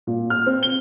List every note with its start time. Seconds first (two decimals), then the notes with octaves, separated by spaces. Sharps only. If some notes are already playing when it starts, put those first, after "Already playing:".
0.07 A#2
0.30 F6
0.46 C4
0.63 G7